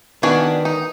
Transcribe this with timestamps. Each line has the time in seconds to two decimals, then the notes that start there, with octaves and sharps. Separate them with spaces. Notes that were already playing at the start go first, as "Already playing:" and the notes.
0.23 D#3 B3 D4 F#4 G#4
0.65 D#4